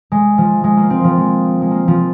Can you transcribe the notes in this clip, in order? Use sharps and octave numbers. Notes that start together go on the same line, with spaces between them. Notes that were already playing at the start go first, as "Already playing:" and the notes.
G#3
F3
G#3
A#3
C4
F3
G#3
G#3
A#3
F3